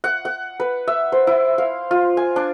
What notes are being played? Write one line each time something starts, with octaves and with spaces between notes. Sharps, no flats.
F#5
F#5
B4
E5
C5
E4
F5
F4
G#5
D4